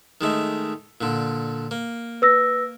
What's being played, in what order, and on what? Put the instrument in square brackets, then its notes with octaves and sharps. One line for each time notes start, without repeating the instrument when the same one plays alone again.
[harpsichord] D#3 G#3 A3
A#2 D3
A#3
[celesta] B4 E6 A#6